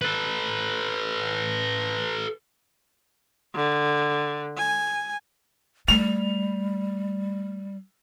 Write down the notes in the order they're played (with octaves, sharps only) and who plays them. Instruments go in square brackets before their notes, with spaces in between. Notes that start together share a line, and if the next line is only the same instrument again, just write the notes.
[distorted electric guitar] A4 B4
[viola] D3
G#5
[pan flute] G3 [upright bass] A3 [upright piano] F7